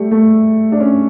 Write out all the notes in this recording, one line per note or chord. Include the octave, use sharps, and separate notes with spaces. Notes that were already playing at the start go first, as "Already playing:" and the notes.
Already playing: G3 A3
A3
D4
C#4